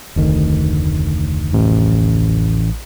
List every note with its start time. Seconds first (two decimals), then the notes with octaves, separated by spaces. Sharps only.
0.16 F1 D2 D#3
1.53 A1